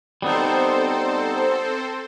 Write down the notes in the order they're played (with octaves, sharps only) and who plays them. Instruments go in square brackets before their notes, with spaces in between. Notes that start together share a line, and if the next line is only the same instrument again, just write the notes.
[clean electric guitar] G3 B3 D#4 [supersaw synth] C4 A4 C5